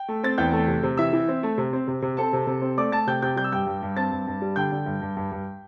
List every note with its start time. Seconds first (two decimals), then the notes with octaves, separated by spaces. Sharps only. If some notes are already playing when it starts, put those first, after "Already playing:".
Already playing: G5
0.08 A3
0.23 C4 A6
0.38 E2 G5 G6
0.53 A3
0.68 C3
0.83 C3
0.97 E3 E5 E6
1.13 E3
1.29 C4
1.43 A3
1.58 C3
1.73 C4
1.87 C3
2.02 C3
2.17 C4 A4 A5
2.33 C3
2.47 C3
2.62 C4
2.78 A3 D5 D6
2.92 A3 A5 A6
3.07 C3 G5 G6
3.22 C3 G5 G6
3.36 G3 G6
3.44 E6
3.52 G2 G5 G6
3.67 G2
3.82 G2
3.96 C4 A5 A6
4.11 G2
4.27 G2
4.42 G3
4.56 D3 G5 G6
4.72 D3
4.86 G2
5.02 G2
5.17 G2
5.32 G2